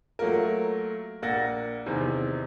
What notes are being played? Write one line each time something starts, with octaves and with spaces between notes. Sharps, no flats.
F#3 A3 A#3 F4 A#4
A#1 A#3 F#5 A6 A#6
E2 C3 D#3